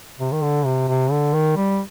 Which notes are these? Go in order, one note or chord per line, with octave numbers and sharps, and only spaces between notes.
C3
D#3
D3
C3
C3
D3
D#3
G3